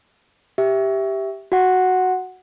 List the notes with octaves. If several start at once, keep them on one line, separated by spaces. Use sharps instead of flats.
G4 E5
F#4 F#5